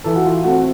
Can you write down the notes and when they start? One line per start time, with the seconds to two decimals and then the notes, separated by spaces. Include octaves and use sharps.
0.04 E3 A4
0.16 F#4
0.25 F4
0.44 A3 C4 F#4